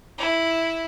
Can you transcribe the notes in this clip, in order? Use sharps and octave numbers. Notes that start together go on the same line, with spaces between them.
E4